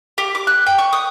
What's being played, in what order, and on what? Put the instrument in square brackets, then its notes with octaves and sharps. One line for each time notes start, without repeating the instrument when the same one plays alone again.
[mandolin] G4
D6
F#6
G5
C#6
D#6